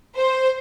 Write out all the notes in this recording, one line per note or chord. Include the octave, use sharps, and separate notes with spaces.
C5